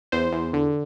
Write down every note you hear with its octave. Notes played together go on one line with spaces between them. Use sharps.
E2 C5
E2
D3